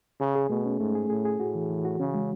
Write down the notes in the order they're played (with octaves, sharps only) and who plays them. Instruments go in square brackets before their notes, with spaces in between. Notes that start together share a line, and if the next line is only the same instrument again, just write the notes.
[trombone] C#3 [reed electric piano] G#4
[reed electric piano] G#4
[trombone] B2 [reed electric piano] A3
[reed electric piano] C#4
[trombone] G#2 [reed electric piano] A3
[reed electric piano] G#4
[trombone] A2 [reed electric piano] G#4
[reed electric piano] G#4
[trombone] A2 [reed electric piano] F#4
[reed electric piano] E3
E3
F#4
[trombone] C#3 [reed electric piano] C#4
[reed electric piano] G#3